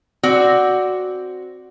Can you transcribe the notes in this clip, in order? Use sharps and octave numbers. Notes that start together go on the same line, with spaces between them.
C4 F#4 D5